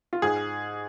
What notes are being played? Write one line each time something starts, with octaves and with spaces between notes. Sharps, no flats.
F4
G#2 G#4